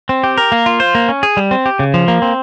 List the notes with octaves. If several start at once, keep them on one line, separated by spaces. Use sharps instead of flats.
C4
G4
A#4
A#3
F4
C5
A#3
C#4
G#4
G3
C4
G4
C#3
F3
A#3
C4